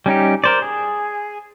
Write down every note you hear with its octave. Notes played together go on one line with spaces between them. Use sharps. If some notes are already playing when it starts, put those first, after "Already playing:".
G3 C#4 D#4 G4
A#4 C5 D5
G#4